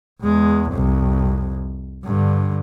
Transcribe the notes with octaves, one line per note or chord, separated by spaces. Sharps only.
E2 G#3
C2 F2
G2 D3